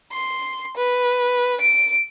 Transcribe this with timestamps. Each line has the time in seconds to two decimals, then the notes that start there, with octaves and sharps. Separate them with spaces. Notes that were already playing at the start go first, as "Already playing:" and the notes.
0.12 C6
0.77 B4
1.61 D7